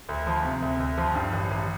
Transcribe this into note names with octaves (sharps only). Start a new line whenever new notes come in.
D2
F3
C3
D2
D2
F3
G2
A1
A1